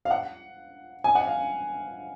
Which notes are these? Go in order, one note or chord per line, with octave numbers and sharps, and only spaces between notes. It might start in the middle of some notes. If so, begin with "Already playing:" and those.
F5
F#5
G#5
F#5
F5